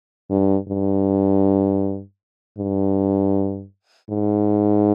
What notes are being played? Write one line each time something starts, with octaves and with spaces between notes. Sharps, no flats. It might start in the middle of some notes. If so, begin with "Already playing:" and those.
G2
G2
G2
G#2